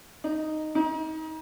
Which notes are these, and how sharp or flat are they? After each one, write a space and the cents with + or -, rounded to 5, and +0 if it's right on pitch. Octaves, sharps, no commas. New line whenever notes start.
D#4 -5
D#4 +30